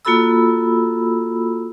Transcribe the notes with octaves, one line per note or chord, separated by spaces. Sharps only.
A#3 F4 F#4 A4 B5 E6